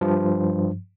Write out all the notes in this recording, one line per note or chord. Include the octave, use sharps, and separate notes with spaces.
G2 F3